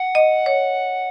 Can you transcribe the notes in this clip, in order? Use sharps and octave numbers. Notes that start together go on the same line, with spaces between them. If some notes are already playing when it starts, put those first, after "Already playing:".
Already playing: F#5
D#5
C#5